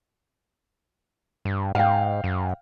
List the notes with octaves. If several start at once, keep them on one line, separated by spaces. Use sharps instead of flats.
G2
G#2 F5 G5
F#2